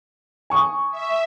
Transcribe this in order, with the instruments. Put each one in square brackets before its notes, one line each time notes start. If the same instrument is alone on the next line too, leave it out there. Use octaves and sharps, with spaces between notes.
[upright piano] G#5 C#6 D#6
[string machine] E5